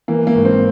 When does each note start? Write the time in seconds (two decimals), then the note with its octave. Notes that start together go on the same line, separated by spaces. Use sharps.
0.08 E3 A#3
0.27 A#3
0.35 G#1
0.45 C4